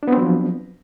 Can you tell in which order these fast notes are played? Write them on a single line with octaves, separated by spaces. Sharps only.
D4 B3 C4 F#3 F3